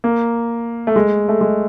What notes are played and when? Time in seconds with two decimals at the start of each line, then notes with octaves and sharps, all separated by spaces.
0.04 A#3
0.87 A3
0.96 G#3
1.29 A3
1.41 G#3